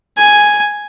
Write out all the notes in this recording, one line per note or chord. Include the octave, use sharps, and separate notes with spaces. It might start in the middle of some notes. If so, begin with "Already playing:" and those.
G#5